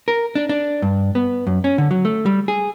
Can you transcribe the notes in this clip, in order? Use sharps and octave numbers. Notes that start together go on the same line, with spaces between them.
A#4
D4
D4
G2
B3
F#2
C#4
D3
F#3
A3
G3
G#4